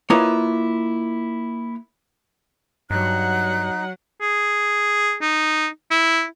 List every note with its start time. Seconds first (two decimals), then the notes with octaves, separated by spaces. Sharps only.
0.10 A#3 E4 F4 B4 C#5 D#5
2.90 G2 F#3 D#4 F#5 F#6
4.21 G#4
5.22 D#4
5.91 E4